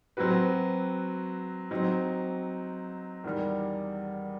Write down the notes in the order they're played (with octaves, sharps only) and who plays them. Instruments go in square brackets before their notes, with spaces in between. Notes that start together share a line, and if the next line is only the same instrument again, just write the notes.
[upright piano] F#3 C4 F#4 B4
F#3 C4 D#4
E2 D#3 G3